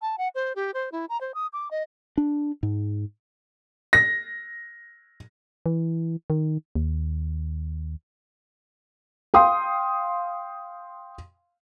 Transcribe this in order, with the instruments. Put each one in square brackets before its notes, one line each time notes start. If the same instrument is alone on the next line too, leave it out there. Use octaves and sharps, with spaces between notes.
[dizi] A5
F#5
C5
G4
C5
E4
A#5
C5
D#6
D6
D#5
[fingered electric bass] D4
G#2
[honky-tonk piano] A#6
[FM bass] E3
D#3
D#2
[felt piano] F5 G5 C6 D#6